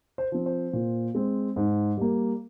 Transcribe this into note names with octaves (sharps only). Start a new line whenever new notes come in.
C5
F3 C4
C5
A#2
G#3 C4
G#2
G3 A#3